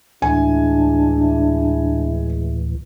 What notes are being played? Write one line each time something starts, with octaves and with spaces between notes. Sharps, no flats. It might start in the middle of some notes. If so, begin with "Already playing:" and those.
D2 A2 E3 G#3 D4 E4 G#5